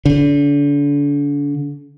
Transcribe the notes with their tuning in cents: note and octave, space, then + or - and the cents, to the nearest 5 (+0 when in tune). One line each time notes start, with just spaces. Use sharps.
D3 -35